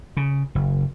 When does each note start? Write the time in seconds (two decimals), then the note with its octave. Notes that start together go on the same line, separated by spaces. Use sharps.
0.17 C#3
0.55 F#1